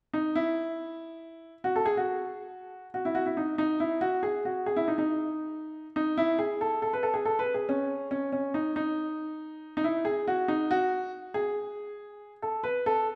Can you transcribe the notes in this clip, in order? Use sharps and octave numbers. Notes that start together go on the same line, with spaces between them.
D#4
E4
F#4
A4
G#4
F#4
F#4
E4
F#4
E4
D#4
D#4
E4
F#4
G#4
F#4
G#4
E4
D#4
D#4
D#4
E4
G#4
A4
A4
B4
A4
G#4
A4
B4
G#4
C#4
C#4
C#4
D#4
D#4
D#4
E4
G#4
F#4
D#4
F#4
G#4
A4
B4
A4